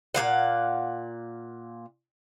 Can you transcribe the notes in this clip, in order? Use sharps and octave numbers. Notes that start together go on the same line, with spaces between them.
A#2 A#3 F5 F#5